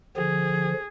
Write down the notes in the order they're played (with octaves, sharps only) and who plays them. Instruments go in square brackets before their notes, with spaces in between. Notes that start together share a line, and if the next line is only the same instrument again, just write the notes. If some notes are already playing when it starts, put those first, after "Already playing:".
[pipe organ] D3 F3 [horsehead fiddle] G#4